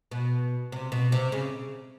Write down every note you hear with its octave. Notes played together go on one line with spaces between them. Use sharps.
B2
C3
B2
C3
C#3